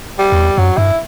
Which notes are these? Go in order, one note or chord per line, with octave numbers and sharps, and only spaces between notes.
G3
E2
F#2 F#3
G2 E4